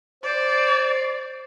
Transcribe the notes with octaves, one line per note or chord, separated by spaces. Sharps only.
C5 D5